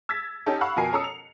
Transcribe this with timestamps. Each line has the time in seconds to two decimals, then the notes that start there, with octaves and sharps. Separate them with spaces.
0.09 E6 G#6 A6 B6
0.46 C#4 D#4 G4 A4
0.61 F5 F#5 B5 C#6 E6
0.76 F2 B2 A#4 G#5 C7
0.93 C#4 A4 A#5 D#6 E6 C#7
1.04 F7